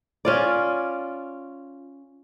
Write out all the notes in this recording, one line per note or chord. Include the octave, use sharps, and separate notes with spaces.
C#4 F4 D5